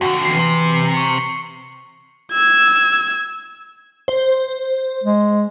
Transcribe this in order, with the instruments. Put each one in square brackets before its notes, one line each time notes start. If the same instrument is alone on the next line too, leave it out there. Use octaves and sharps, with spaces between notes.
[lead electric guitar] F2 D3 [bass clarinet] F#4
[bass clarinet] E3 [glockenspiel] C7
[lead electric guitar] C3
[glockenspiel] C#6 C#7
[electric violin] E6 G#6
[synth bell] C5
[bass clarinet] G#3